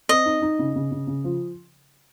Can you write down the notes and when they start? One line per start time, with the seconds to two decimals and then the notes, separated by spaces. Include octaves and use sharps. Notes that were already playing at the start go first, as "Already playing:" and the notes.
0.09 C4 D#5
0.26 D#4
0.42 D#4
0.59 C#3
0.76 C#3
0.91 C#3
1.07 C#3
1.24 F3